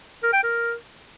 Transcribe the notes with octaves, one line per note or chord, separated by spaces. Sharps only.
A#4
G5
A#4